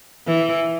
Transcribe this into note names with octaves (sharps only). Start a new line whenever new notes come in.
E3